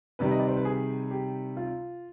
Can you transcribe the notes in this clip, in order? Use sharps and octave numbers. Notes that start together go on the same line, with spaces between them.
C3 D#3 G3 B4
D#5
D5
C5
B4
G#4
G4
F4